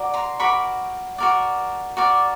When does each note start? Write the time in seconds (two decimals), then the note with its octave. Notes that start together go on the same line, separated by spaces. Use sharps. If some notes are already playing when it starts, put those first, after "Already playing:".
Already playing: F#4 A#4 D5
0.14 A#5 C6
0.40 F#4 A#4 D5 B5 C#6
1.18 F#4 A#4 D5
1.97 F#4 A#4 D5